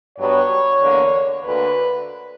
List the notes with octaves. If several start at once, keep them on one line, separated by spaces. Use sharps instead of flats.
G2 F#3 B3 C#5
E2 D3 A#3
D2 D3 A#3 B4